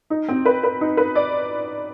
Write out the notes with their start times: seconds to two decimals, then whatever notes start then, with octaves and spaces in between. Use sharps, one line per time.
0.10 D#4
0.28 C4
0.46 B4
0.63 B4
0.81 D#4
0.97 B4
1.15 D5